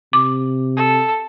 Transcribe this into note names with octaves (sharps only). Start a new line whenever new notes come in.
C3 D6
A4